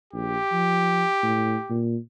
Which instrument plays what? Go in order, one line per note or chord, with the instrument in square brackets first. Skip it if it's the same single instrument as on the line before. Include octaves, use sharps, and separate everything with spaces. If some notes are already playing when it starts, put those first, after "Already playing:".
[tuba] A#1 [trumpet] G4
[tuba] F3
A2
A#2